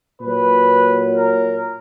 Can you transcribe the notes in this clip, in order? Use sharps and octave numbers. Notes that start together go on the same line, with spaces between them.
A#2 F#3 B4
A#4